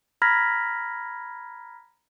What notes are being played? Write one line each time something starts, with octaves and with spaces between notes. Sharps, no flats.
A#5 B5 F6 G#6 A#6 B6